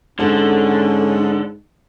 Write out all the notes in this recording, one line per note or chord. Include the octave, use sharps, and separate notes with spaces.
G#2 D3 C#4 A4 C5